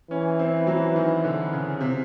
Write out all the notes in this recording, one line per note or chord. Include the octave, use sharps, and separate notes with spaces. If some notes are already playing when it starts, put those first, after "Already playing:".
E3 C#4
C4
F#3
D#3
D3
C#3
C3